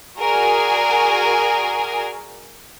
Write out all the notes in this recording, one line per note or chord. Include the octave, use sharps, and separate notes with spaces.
F#4 G#4 A#4 D5 G#5